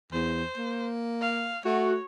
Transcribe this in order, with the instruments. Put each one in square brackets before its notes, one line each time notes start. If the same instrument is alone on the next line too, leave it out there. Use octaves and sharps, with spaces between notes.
[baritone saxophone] E2 [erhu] C5
[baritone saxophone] A#3
[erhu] F5
[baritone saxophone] A3 [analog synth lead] F#4 [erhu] C#5